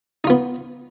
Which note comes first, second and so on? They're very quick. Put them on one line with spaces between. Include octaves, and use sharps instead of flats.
D#4 F4 B3